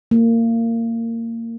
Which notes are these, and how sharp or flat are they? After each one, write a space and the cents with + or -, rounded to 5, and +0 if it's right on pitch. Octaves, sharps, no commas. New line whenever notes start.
A#3 -25